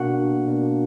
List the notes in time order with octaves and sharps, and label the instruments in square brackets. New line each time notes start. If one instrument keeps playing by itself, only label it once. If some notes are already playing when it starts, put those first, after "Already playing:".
Already playing: [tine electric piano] B2 A#3 D4 F#4 F#5
B2 A#3 D4